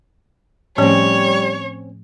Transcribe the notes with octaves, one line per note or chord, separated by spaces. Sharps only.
A2 F3 G3 A3 C4 C#4 C#5